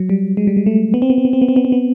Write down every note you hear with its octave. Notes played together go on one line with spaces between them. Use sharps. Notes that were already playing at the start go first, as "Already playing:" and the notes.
Already playing: F#3
G3
G#3
G3
G#3
A3
B3
C4
B3
C4
B3
C4
B3
C4
B3
C4
B3